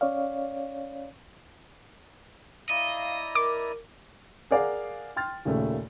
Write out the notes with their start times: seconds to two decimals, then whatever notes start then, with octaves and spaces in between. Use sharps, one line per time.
0.01 C#4 C#5 D5 F5
2.70 E4 D5 D#5 F5 A#5
3.35 A#4 D6
4.51 G#4 A#4 D5 F5 F#5
5.16 G5 C6 F6 A6
5.45 D#2 A#2 C#3 A3